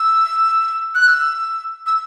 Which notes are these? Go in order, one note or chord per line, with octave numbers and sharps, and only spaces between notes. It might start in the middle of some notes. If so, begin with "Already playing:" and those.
Already playing: E6
F#6
E6
E6